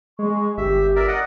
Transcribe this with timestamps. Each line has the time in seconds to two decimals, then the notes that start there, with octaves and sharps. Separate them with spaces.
0.19 G#3 C#6
0.58 G1 G4 E5
0.96 A#4 D5 E5
1.08 D5 D#5 F#5